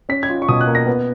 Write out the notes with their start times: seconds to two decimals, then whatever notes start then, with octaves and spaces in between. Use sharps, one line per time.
0.09 C#4 B6
0.23 G#6
0.29 F4
0.42 C#6
0.49 B2 D#6
0.61 F#6
0.67 A#3
0.75 A#6
0.87 B3